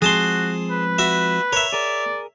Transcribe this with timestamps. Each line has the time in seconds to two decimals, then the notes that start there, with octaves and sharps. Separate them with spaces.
0.02 F3 G#3 C4 F#4 G#4 A5 C6
0.70 B4
0.98 F#4 E5
1.53 A#4 C#5 E5
1.73 G#4 A#4 D5